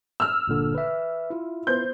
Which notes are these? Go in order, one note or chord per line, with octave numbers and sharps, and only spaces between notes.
E6 F6
G1 A#2 D3
B4 E5
E4 F4
B3 C5 G6